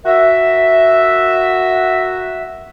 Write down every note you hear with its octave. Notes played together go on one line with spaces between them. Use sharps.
F#4 A#4 E5